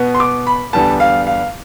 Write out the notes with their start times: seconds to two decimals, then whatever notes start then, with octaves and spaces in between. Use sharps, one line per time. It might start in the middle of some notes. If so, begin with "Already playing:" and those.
Already playing: B2 B3
0.14 C6
0.20 D6
0.47 B5
0.73 E2 D3 G3 B3 A5
1.00 F5
1.27 F5